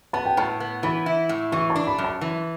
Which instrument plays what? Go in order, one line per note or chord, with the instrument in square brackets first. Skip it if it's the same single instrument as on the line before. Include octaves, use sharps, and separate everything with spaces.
[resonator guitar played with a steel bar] B3 [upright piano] A5
[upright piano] G5
[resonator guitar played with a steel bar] A2 [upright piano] A5
[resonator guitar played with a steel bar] B3
[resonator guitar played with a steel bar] E3 [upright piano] B5
[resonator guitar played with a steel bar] E4
A2
[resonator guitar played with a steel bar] E3 [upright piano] C#6
[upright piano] A5
[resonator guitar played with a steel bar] D4
[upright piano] B5
[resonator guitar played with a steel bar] F#2
[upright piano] A5
[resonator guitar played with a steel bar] E3